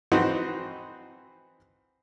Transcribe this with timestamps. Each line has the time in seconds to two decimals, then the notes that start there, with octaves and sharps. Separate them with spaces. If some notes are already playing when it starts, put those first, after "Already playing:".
0.12 E3 C4 D#4 F#4 C5